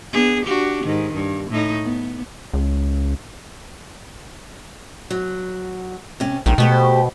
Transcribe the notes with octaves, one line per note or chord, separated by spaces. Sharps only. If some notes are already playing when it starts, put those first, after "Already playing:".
B3 D4 G#4
D4 F#4 G4
G#2 D#3
G2
A2 D#4
B3
C#2
F#3
C3 C#4
A#1 D#3 A#4
B2 A3 G4 C5